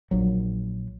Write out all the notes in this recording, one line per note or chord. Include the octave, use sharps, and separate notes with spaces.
A#1 A#2 F#3